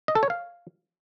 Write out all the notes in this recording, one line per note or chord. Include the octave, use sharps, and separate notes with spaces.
D#5
A4
C#5
F5